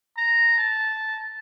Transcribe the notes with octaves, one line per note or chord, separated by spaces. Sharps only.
A#5
A5